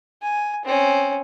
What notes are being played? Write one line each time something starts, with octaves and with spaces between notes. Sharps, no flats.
G#5
C4 C#4